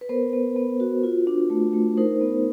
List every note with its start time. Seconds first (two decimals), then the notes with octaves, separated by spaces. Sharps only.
0.01 B4
0.09 B3 A#4 C5
0.33 B3
0.56 B3
0.80 F#4
1.03 F4
1.27 D4
1.50 A3
1.73 A3
1.97 D#4 A#4 C5
2.21 B3